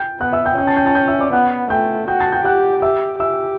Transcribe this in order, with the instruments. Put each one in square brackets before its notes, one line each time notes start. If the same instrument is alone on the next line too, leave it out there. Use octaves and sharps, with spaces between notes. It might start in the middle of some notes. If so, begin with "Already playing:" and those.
Already playing: [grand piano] G5 G6
[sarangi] B3 [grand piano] F#5 F#6
[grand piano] E5 E6
G5 G6
[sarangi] C#4 [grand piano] G5 G6
[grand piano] A5 A6
G5 G6
A5 A6
G5 G6
E5 E6
D5 D6
[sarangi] B3 [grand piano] F#5 F#6
[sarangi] A3 [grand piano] G5 G6
[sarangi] F#4 [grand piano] G5 G6
[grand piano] A5 A6
G5 G6
[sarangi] G4 [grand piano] F#5 F#6
[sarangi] G4 [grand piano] E5 E6
[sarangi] G4 [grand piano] E5 E6